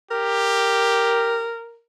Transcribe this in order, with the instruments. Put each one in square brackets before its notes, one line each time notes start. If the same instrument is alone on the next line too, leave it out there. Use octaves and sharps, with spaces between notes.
[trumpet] G4 [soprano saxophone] A#4